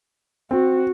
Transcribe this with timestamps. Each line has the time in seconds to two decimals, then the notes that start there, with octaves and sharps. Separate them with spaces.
0.51 C4 F#4